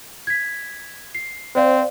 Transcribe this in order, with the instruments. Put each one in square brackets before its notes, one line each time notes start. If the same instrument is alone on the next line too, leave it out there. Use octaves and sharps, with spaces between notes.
[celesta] G#6 B6
C7
[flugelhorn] C4 [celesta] C5 D5 F5